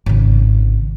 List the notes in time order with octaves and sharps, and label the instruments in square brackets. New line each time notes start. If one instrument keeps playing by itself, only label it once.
[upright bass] G#1 C#3